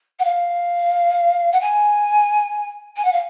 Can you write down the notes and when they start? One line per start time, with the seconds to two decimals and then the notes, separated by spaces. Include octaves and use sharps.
0.19 F#5
0.24 F5
1.52 F#5
1.61 G#5
2.96 G#5
3.05 F#5
3.12 F5